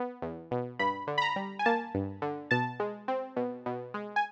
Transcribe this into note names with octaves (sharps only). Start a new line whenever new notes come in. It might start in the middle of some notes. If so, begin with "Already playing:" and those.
Already playing: B3
E2
B2
G2 B5
D3
B5
A#5
G3
G#5
A#3 A5
G2
D3
B2 A5
G#3
C4
B2
B2
G#3
G#5